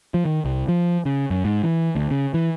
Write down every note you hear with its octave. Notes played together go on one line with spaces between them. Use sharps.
F3
D#3
C2
F3
C#3
F#2
G#2
E3
D2
C#3
E3